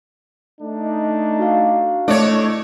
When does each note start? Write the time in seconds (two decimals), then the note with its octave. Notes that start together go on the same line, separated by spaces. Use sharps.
0.61 A3 D4 D#4
1.39 F#4 F5
2.08 A3 D4 E4 C#5 D#5 D6